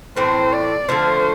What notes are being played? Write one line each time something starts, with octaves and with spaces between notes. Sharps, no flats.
A2 E3 A3 C4 C5
D5
D3 F3 A3 C5